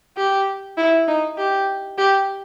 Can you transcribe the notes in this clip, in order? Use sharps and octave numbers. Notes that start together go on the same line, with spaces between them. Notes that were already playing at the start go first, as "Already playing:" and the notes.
G4
E4
D#4
G4
G4